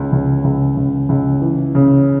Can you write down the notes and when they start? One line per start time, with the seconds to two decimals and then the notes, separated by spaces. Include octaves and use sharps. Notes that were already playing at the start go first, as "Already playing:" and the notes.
Already playing: C#2
0.12 C#2
0.44 C#2
0.77 C#2
1.09 C#2
1.42 E3
1.75 C#3